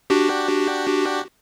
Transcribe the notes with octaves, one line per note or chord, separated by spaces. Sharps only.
D4 F#4 G4